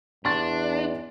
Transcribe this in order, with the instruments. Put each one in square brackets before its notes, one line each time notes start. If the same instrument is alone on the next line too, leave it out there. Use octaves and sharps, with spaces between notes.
[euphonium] E2 [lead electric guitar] D4 [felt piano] C6 A6